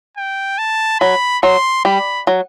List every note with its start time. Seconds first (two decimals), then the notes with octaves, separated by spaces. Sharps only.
0.17 G5
0.58 A5
1.00 F#3 B5
1.43 F#3 C6
1.85 G3 B5
2.27 F#3